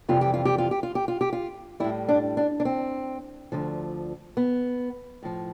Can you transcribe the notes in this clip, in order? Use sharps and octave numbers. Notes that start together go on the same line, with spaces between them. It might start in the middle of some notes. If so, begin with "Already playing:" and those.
F2 C3 E3 G3 F4
G4
F4
G4
F4
G4
F4
G4
F4
G4
F4
A2 G3 E4
D4
D4
D4
C4
D2 D3 F3
B3
A2 F3